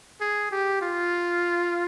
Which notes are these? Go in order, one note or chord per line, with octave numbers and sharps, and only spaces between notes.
G#4
G4
F4